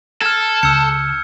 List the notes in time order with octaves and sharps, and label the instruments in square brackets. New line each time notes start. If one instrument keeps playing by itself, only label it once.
[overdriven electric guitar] A4 [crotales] F6 G#6
[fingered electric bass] C#2 [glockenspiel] E6 C#7 [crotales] G6